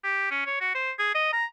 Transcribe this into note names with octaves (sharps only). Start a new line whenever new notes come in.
G4
C#4
C#5
F#4
C5
G#4
D#5
A#5